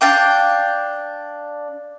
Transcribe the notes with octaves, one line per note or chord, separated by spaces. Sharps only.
D4 F5 G5 D6